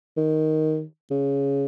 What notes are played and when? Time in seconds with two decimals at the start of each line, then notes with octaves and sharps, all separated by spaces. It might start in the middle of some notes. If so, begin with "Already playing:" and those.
0.17 D#3
1.11 C#3